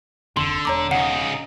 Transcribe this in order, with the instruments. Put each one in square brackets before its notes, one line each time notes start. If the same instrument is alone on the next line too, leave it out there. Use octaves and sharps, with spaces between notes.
[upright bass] F1 D2 [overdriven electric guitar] D3 [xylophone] C6
[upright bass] E1 [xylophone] C#5 A#5 D6
[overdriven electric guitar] C#3 D#4 [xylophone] F#5